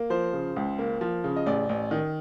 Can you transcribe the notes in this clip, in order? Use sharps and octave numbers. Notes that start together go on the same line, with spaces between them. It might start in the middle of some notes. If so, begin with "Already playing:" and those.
Already playing: A#3
F3 C5
C#3
C#2
A#3
F3
C#3
D#5
A1 D5
A1
D#3